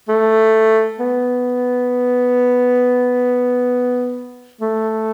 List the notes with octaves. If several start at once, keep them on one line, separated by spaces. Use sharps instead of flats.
A3
B3
A3